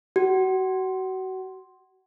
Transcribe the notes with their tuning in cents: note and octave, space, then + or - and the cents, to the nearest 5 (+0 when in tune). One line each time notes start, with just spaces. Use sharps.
F#4 +30